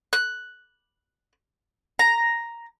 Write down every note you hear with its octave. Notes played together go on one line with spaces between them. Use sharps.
F#6
A#5